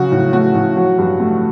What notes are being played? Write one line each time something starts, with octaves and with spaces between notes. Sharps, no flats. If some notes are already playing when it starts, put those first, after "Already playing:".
Already playing: C#3 F#3 F#4
A2
A3 F#4
A2
F#3
G2
A3